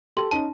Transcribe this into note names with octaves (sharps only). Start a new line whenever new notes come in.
G4 A4 C6
C#4 D#4 A5